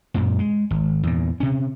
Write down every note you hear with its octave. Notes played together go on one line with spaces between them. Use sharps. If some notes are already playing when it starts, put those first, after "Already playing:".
F#2 A#2
G#3
G#1
E2 A#2
C3 C#4